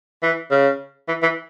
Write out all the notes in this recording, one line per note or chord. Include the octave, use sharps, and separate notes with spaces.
E3
C#3
E3
E3